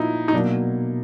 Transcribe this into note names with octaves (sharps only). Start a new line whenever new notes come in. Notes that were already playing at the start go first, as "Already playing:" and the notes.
Already playing: A#2 F3 A#3 D#4 E4
D#4
B2 F#3 A#3 D4